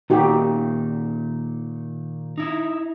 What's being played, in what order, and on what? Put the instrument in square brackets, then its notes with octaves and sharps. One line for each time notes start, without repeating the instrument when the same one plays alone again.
[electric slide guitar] A#2 D#3 [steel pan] D#4 F#4 G4
[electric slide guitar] D#4 E4